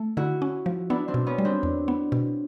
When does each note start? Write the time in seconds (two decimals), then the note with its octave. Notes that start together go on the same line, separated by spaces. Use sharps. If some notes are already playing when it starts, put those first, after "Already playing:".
Already playing: A3
0.17 D3 E4 F#4
0.42 C#4
0.66 F3
0.90 B3 D4 E4
1.08 C4 D4
1.14 B2
1.26 B3 C#4
1.38 G3
1.45 C4 D4
1.63 E2
1.88 B3
2.12 B2